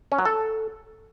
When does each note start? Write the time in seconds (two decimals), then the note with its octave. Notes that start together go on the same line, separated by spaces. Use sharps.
0.12 C#4
0.19 F#3
0.25 A4